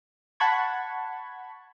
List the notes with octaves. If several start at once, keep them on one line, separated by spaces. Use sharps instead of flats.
F#5 A5 B5 C#6 G#6